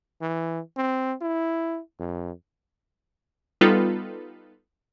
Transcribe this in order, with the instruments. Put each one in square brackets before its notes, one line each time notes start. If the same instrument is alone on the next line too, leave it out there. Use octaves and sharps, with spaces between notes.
[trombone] E3
C4
E4
F2
[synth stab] G3 B3 D#4 F4 A4 B4